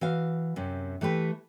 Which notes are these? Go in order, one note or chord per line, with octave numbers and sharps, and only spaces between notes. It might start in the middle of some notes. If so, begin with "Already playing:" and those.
E3 F#4 F5
F#2 C3
E3 A3 G4 B4